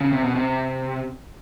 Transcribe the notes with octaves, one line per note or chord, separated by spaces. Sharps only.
C#3
C3
B2
C3